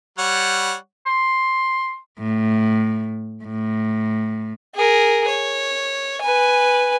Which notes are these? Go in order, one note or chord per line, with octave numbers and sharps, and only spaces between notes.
G3 C#5 F#5
C6
A2
A2
G#4 A#4
C#5
B4 G#5